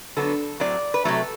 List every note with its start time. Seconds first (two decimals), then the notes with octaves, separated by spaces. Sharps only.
0.17 D3 F#3 B3 A4
0.60 A2 F#3 C4 D5
0.94 B4
1.05 C3 F#3 A3 A4